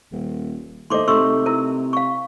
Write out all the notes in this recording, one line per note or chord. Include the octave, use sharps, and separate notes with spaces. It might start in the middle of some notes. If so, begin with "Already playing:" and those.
D#1
D#2 A3 C5 D#5 C6 D6
C3 A3 D#4 C6 C#6 E6
E4 A#4
F5 C#6